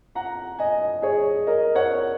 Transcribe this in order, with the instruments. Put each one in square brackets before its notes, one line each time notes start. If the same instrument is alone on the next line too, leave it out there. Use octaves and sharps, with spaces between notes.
[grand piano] F#5 A#5
D#5 G#5
G#4 C#5
A#4 D#5
C#5 F#5